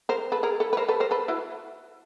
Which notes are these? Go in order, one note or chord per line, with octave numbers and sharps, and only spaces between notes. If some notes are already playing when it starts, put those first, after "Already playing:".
A#4 C5
A4 B4
G#4 A#4
A4 B4
B4
A#4 C5
A4 B4
A#4 C5
A4 B4
E4 F#4